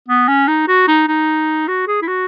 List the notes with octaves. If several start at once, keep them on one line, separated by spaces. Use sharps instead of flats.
B3
C#4
D#4
F#4
D#4
D#4
F#4
G#4
E4
F#4